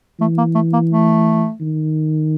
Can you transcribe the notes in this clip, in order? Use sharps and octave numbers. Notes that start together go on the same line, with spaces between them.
E3 A3
A#3
A3
A#3
A3
D#3